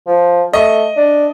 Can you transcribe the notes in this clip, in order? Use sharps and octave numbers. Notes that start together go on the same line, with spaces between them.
F3
A3 D#5
D4